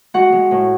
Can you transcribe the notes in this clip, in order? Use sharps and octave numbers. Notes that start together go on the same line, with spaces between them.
G#3 F#4 F#5
G#3
A2